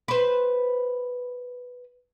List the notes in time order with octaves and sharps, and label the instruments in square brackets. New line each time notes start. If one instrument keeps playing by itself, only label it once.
[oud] B4 C5